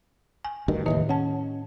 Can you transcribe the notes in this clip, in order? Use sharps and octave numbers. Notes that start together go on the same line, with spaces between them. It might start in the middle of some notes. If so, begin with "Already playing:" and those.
G#5
D2 G2 D#3
F1 D#2 A2 D#3 E3 D#5
C#4 F#5 A5